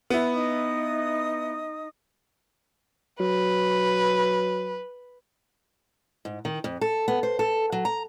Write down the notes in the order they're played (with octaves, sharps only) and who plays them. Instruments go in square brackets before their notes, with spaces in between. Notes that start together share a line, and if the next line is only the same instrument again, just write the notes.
[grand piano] B3 E4
[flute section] D#4 D#5 D#6
[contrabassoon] F#3 [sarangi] B4
[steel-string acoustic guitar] G#2
D#3
F2
A4
B3
C5
A4
F#3
A#5